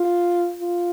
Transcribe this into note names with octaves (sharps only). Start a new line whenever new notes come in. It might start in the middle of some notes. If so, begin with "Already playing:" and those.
Already playing: F4
F4